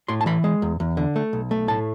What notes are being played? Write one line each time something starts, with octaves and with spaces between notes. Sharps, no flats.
A2 C6
A5
E3 B5
G#3
E2
E2
D3
A3
B1
A3
A2 A5